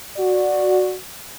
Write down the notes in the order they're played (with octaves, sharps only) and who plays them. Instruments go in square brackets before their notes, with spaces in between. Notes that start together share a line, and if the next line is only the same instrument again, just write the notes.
[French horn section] F#4 D5